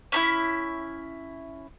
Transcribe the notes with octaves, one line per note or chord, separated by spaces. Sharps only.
C#4 D4 E4